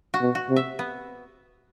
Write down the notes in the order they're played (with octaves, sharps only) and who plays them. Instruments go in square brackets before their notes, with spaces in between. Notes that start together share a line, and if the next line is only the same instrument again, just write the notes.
[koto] F#4
[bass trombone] B2
[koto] F#4
[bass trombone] C3
[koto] E5
B3